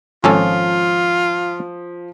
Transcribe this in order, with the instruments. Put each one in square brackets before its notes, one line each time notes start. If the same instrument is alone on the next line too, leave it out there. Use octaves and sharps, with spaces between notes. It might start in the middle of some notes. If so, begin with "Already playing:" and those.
[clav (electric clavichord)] G#1 C#4 A4 [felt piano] F3 [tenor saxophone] F4